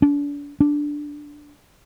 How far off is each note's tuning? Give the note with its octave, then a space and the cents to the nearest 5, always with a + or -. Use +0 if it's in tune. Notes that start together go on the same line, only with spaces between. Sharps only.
D4 -35
D4 +0